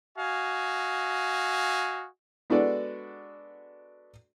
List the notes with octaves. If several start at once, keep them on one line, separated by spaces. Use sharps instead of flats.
F#4 D#5 F5 G#5
G#3 B3 D4 F#4 A4 D5